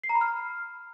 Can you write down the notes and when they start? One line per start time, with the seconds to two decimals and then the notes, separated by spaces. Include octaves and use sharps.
0.04 C7
0.09 A#5
0.15 B5
0.21 F6